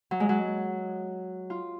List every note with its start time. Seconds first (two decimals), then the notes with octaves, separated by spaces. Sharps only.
0.11 F#3
0.20 G#3
0.29 F#3
1.50 F4